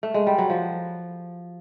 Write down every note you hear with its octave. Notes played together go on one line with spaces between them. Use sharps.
A3
G#3
G3
F#3
F3